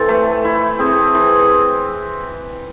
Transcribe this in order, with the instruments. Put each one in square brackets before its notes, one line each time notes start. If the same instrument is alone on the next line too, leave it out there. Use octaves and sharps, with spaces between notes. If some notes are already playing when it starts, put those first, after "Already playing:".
Already playing: [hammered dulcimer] E3 C4 [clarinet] A4
[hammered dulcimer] A3
E4
[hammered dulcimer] C4 [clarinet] G#4
[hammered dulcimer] E3